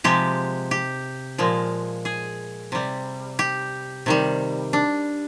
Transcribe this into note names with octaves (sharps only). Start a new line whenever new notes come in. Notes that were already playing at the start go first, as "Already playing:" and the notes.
C3 F3 G#3 G4
G4
A#2 F3 G#3
G#4
C3 G3
G4
C3 D#3 G3
D4